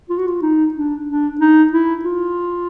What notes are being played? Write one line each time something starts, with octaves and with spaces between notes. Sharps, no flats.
F4
F#4
F4
D#4
D4
D4
D#4
E4
F4